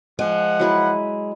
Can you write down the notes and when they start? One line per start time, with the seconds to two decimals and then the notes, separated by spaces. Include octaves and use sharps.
0.19 F3 G#3 F#5
0.59 F#3 E4 B4